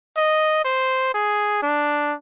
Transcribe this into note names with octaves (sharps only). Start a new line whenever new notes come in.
D#5
C5
G#4
D4